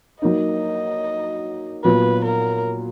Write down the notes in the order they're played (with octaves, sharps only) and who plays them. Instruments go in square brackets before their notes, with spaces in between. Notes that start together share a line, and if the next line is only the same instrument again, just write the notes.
[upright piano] F#3 A#3 D#4 [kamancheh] D#5
[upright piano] A#2 F#3 B3 F4 [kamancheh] B4
[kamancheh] A#4